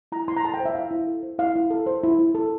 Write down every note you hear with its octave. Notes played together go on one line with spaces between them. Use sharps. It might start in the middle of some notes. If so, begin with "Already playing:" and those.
E4 A#5
E4 C6
A#5
A4 A5
G5
C5
E5
E4 F5
E4
A4
C5
E4 F5
E4
A4
C5
E4
E4
A4